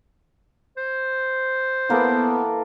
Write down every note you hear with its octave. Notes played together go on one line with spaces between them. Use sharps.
C5
E3 A#3 B3 A4